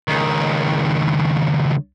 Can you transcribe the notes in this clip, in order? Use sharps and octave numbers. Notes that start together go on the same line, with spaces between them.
C#2 D#3